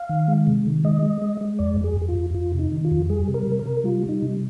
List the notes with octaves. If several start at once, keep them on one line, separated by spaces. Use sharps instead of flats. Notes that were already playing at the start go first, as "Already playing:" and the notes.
Already playing: F5
D#3
G#3
C3
D#3
G#3 D#5
G#3
G#3
G#3
F2 D5
F2
G#4
F2
F4
F2
F2 F4
C3
D#4
D#3
F4
F2
G3 G#4
C3
A#4
C3
A#4
C3
G3 F4
G3
D#4
C3